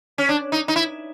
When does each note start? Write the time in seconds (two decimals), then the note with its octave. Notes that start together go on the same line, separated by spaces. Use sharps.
0.18 C#4
0.29 D4
0.52 D#4
0.68 D#4
0.76 E4